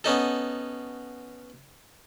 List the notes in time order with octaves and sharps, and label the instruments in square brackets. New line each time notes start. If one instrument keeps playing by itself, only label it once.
[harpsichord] B3 C#4 D#4 A4